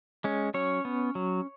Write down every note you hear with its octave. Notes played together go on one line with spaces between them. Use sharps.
G#3 C#4
F#3 C#4 C#5
B3
F#3